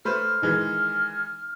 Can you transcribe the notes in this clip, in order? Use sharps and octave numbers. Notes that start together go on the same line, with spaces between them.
A3 B4 C5 F6
D#3 E3 G#3